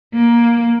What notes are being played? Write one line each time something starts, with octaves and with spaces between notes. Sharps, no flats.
A#3